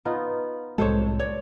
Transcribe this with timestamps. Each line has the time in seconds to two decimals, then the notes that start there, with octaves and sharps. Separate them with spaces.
0.05 B3 D#4 F4
0.78 C2 A2 G#3 A4 C5 C#5
1.19 C#5 D5